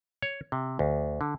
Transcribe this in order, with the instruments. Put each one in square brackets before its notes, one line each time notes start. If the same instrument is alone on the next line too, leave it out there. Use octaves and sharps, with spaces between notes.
[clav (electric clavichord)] C#5
C3
D2
D3